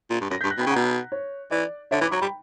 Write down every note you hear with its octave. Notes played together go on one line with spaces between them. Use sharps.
A#2
G2
F#2 A#6
G6 B6
G2
F#6 A#6
B2 G5 B5
C#3 F#5 A#5
B2
C#5
E3 D5
D3 C#5 E5
E3 B5 D6
F#3 A#5 C#6
G3 G5 B5